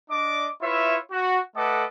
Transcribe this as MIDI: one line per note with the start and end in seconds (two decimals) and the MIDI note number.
0.11 0.48 62
0.11 0.48 74
0.11 0.48 75
0.11 0.48 86
0.62 0.97 64
0.62 0.97 65
0.62 0.97 71
0.62 0.97 73
0.62 0.97 76
1.12 1.39 66
1.56 1.85 57
1.56 1.85 69
1.56 1.85 71
1.56 1.85 75
1.56 1.85 78
1.56 1.85 86